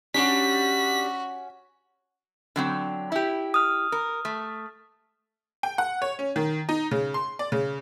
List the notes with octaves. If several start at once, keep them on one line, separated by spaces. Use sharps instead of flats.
G3 C#4 D4 F#4 B6
D3 F#3 C4
E4 G4
D#6 F6
A#4
A3
G5
F#5
C#5
C#4
D#3
D#4
C#3
C6
D5
C#3